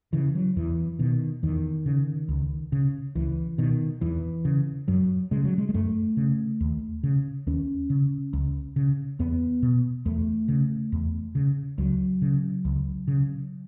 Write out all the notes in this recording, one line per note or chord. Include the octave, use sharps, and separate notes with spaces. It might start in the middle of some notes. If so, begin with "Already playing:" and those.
C#3 E3
F#3
E2 E3
B2 D#3
E2 D#3
C#3
C#2
C#3
C#2 E3
B2 D#3
E2 E3
C#3
F#2 F#3
C#3 G#3
F#3
G#3
G#3
F#2 A3
C#3
D#2
C#3
D#2 C#4
C#3
C#2
C#3
E2 B3
B2
E2 A3
C#3
E2
C#3
C#2 F#3
C#3
C#2
C#3